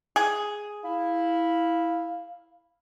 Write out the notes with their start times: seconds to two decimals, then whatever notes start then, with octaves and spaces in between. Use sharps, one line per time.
0.16 G#4
0.85 E4 F5